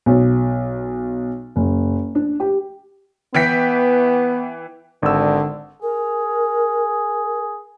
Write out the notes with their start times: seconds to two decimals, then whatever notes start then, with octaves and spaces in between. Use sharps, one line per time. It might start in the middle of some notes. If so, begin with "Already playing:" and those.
0.06 B1
1.56 F#1
2.15 D4
2.40 G4
3.35 E3 B3 G5 B6
5.03 G#1 D3 E6
5.83 G#4 A#4